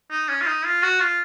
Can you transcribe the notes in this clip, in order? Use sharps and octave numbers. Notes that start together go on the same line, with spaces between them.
D#4
C#4
F4
D#4
F4
F#4
F4